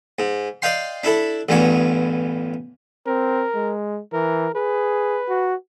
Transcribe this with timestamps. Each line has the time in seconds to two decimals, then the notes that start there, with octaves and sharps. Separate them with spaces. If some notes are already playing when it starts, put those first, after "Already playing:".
0.19 G#2
0.62 D5 D#5 F5 G5 C6
1.04 D4 E4 A4 A5
1.49 A1 E2 G2 D3 C#5
3.07 C4 A#4
3.55 G#3
4.13 E3 A#4
4.55 G#4 B4
5.29 F#4